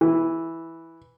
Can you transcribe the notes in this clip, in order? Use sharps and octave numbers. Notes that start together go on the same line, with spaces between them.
E3